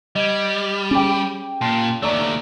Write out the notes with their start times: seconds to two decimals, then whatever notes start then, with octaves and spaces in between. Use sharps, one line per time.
0.16 G3 D#5 G#6
0.91 C#4 G4 G#4 G5 D6
1.61 A#2 A5 C6 C7
2.02 D#2 A3 D5 A#5 C#6 D6 E6